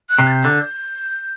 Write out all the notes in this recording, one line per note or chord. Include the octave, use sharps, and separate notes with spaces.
F#6
C3
A6
G6
D3